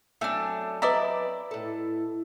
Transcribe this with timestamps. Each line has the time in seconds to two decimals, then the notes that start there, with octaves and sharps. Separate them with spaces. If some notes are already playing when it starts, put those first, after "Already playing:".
0.21 F#3 A3 C4 D4 G#5
0.82 E4 B4 D5 D#5 A#5
1.51 A2 A4